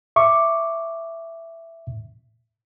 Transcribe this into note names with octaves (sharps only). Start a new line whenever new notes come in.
E5 C#6 D6